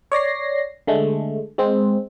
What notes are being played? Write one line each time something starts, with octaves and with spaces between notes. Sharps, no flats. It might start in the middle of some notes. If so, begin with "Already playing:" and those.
C#5 D5 A#6 C7
D3 G#3 A3
G#3 C4